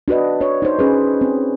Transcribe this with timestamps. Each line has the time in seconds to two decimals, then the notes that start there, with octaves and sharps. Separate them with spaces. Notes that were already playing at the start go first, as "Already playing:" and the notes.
0.08 D4 F#4 B4 D#5
0.40 D4 C#5
0.62 D#4 C5
0.79 C#4 G#4 B4
1.21 C4